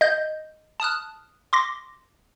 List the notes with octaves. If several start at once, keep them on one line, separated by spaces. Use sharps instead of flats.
D#5 G6
A5 D#6 F6 F#6
C6 D6 A#6